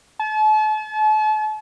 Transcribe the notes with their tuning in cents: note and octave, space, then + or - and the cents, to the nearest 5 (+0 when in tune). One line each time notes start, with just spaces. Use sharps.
A5 -40